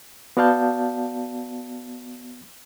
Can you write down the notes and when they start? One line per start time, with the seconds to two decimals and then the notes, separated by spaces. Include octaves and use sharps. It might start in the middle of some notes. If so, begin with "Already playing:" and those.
0.37 B3 F#4 D5 F5 A5 G6